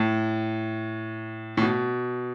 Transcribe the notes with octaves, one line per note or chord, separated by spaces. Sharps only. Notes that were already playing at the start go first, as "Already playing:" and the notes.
Already playing: A2
A2
B2